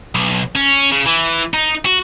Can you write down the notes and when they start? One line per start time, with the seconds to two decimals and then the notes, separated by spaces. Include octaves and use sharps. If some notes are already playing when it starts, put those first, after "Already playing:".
0.15 B1
0.55 C#4
0.92 C#3
1.06 E3
1.54 D#4
1.85 F#4